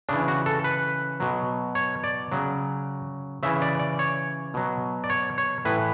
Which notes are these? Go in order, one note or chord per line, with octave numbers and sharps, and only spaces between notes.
C#3 E3 D4
F#4
A4
B4
B2 F#3
C#5
D5
C#3 F#3
C#3 E3 E5
D5
D5
C#5
B2 F#3
D5
C#5
C#5
A2 E3 B4